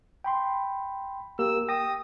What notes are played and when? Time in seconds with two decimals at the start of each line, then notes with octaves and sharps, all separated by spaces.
0.24 G5 B5 C6
1.39 A#3 G4 A#4 E6
1.68 G5 D#6 A#6